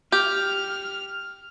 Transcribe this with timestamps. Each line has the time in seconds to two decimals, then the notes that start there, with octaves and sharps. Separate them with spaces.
0.12 G4 F6